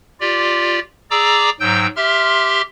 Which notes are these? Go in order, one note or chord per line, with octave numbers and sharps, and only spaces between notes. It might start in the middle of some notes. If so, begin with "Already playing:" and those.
F4 G4 D5
G#4 D5 A#5 D6 E6
G#2 F#3 G5 E6 G6
G4 E5 C6 F6